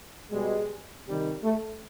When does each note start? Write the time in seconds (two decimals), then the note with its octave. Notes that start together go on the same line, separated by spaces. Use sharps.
0.31 B2 G3 G#3
1.06 C3 D#3 G3
1.43 A3